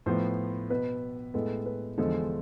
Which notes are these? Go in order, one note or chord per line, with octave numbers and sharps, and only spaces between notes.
A2 F3 B3 C5
B2 B3 B4
A2 G#3 B3 A4
B4
E2 D3 F3 G#3 A4